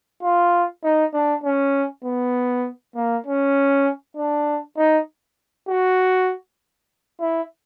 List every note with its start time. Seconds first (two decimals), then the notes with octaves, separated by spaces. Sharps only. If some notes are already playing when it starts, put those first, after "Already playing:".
0.23 F4
0.84 D#4
1.13 D4
1.44 C#4
2.04 B3
2.95 A#3
3.26 C#4
4.17 D4
4.77 D#4
5.69 F#4
7.21 E4